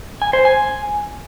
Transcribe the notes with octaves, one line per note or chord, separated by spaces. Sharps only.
G#5
C5
G#5